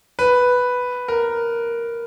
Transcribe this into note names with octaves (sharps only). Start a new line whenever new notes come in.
B4
A#4